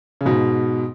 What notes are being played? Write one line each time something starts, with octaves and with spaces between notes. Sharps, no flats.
C#3
G#2 B2